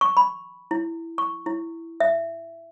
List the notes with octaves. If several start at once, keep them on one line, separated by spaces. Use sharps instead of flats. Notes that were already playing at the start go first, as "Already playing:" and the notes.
C#6
B5
E4
C#6
E4
E5